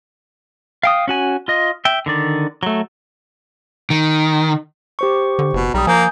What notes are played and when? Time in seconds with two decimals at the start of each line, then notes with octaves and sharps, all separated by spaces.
0.83 F5 G5 D#6
1.08 C#4 F#4 G#5
1.48 F4 D#5
1.85 E5 G5
2.06 D3 D#3 D5
2.63 F#3 A3
3.90 D#3
4.99 G4 C5 C#6
5.39 D3
5.53 F#1 B2
5.74 B1 G3 A#5 D#6
5.87 F3 A#3 G#5 G6